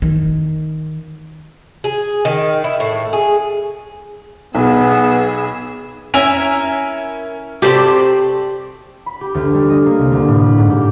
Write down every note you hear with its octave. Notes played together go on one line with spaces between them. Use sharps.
D#3
G#4
D#3
E4
A2
G#4
B1 B3 G#4 E6
C#4 E4 A#4 E5 G#5 F7
C3 A3 G4 C5 D5
B5
G4
D2
G3
D#5
A#3
C2
D2
A2
B5
G#2
G4